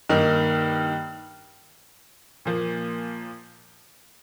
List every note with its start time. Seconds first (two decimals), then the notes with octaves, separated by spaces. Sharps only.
0.09 G2 D#3 A#3 D#4
2.45 A#2 F3 A#3